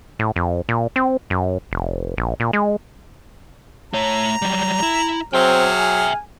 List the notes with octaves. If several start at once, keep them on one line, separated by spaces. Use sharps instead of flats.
A2
F2
A#2
C4
F#2
F1
A#1
A#2
G#3
A3 C#5 A#5
F#3 G3
E4
F#3 C4 G#4 E5 G5 F6
G#5